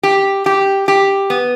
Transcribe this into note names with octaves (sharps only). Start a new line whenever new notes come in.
G4
G4
G4
B3